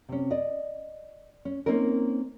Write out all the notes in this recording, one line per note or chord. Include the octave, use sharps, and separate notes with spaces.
C3 C#4
D5 D#5
C#4
A#3 C4 C#4 D#4 A#4